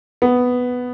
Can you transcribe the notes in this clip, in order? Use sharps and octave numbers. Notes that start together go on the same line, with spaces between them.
B3